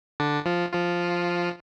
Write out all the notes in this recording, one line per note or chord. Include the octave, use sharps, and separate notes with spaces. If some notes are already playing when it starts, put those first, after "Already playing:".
D3 D4
F3 F4
F3 F4